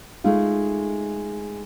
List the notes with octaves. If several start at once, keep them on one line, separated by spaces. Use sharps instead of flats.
G#3 A3 D#4 F4